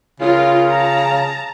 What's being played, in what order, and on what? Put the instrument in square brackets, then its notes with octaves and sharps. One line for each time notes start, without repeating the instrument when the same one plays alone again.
[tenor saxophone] C#3 [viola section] F4 A#4
[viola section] A5 A#5